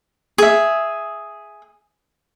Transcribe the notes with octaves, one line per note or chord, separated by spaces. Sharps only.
G#4 E5